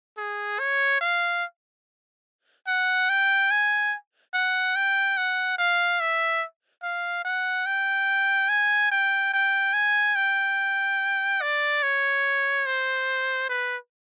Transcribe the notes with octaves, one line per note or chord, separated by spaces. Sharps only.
G#4
C#5
F5
F#5
G5
G#5
F#5
G5
F#5
F5
E5
F5
F#5
G5
G#5
G5
G5
G#5
G5
D5
C#5
C5
B4